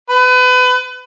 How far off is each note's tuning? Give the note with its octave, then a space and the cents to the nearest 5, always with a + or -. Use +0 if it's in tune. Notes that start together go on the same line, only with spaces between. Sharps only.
B4 +30